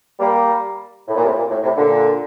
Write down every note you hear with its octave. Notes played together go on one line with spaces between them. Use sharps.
G3 A#3
A2
A#2
A2 C3
A#2
A2
A2 C3
A#2 D3